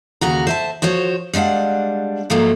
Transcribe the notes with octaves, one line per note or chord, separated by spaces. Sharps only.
D#2 C#3 F#4 A#5
C5 E5 A5
F3 F#4 C5 C#5
G3 G#3 D4 F5 F#5
G#2 F3 F#3 A3 A#3